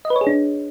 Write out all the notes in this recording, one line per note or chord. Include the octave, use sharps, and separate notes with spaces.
D#5
B4
C#5
G#4
D4